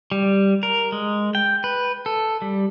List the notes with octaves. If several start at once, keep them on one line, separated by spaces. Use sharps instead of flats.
G3
A#4
G#3
G5
B4
A4
G3